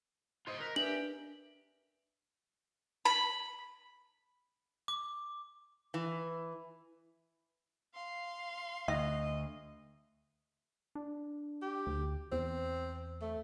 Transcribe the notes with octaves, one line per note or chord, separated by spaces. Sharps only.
F4 C5 D#5
A#4 F#6 B6
D4 G4 A#4 B4 E5 F#7
B5
D6
E3
F5 C6
D2 D#5 E5
D4
G4
D2
E2 C4
A3